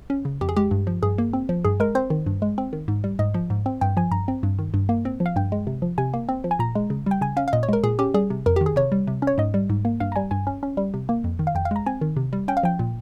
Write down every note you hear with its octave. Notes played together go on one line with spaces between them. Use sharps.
C#4
C#3
F2 G4
G#4
G#3 G4
G2
F3
G2 G#4
A#3
C4
F3
G2 G#4
G#3 A#4
C4 C5
D#3
G2
G#3
C4
D#3
G#2
G3
G#2 D#5
F3
G#2
C4
G2 G5
F3 G#5
G2 A#5
C4
G2
D#3
G2
A#3
C4
F3
F5
G2 G5
G#3
C3
F3
C3 G#5
A#3
C4
F3
G#5
A#2 A#5
G#3
C#3
G3 G5
C#3 G#5
C#4 F5
F5
A#2 D#5
C#5
G#3 A#4
A#2 G#4
C#4 G4
G3 G#4
C3
F2 A#4
D#3 G4
G#4
C3 C#5
G3
C3
C#4
C#5
G#2 D#5
G3
G#2
A#3
G2 F5
A#5
G3 G#5
G2 G#5
C#4
C#4
G3
C3
A#3
F2
D#3
F5
F2 G5
F5
G#3 A#5
C4 G#5
D#3
C3
G3
C#4 G5
F5
F3 G5
A#2